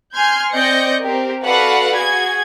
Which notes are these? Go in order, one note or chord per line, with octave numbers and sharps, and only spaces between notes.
G#5 C6 F6 G6 G#6
C4 D5 D#5 G6 A#6 C#7
C4 G4 A#4
F#4 A4 B4 D5 F5 F#5
F#4 G#4 G#6